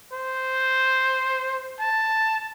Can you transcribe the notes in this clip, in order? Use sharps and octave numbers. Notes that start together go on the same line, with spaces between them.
C5
A5